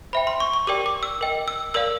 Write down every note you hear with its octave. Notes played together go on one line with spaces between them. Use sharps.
C5 E5 G5 B5
C6
C#6
C#6
G4 A#4 D5 G5 D6
D6
E6
A#4 D#5 G5
E6
A#4 D5 F5 E6